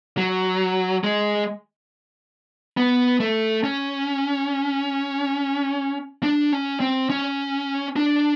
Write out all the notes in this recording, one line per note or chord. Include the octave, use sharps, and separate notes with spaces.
F#3
G#3
B3
A3
C#4
D4
C#4
C4
C#4
D4